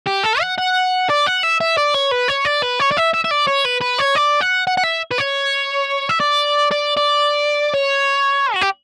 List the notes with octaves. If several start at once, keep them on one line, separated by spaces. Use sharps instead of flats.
G4
A4
F#5
F#5
D5
F#5
E5
E5
D5
C#5
B4
C#5
D5
B4
C#5
D5
E5
E5
E5
D5
C#5
B4
B4
C#5
D5
F#5
F#5
F#5
E5
B4
C#5
E5
D5
D5
D5
C#5
F#4
G4